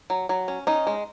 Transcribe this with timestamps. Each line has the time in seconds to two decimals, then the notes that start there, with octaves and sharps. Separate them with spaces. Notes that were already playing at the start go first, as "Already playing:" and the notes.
0.10 F#3
0.29 F#3
0.48 C#4
0.67 C#4 D#4
0.87 G#3